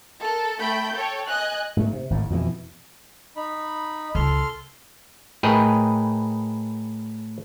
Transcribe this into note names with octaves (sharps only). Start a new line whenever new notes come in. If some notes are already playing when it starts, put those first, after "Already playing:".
A4 A#4
A3 G5 B5 G6
A4 C#5 G5
D#5 G#5 F#6
G#2 A3
C3
G#1 A2
F2 B2 D3 E3
D#4 B5
C#2 A4 C6 F6
A2 G#4 A#4 B4 D#5 G5